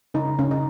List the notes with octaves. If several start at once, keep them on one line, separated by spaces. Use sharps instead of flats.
C#3 D#4
C#3 C#4
D#4